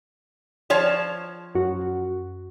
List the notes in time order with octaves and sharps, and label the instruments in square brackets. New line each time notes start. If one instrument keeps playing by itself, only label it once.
[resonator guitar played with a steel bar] F3 C#5 A5
[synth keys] F#2 F#4